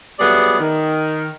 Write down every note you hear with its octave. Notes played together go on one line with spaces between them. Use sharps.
F#3 G3 A3 B3 G#4 D5
D#3